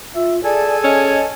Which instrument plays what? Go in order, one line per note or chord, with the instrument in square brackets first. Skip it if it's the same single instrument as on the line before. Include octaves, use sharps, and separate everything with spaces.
[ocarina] F4 [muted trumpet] E5
[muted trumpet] G#4 [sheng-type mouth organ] A4 G#5 [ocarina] D5
[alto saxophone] C#4 [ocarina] D#5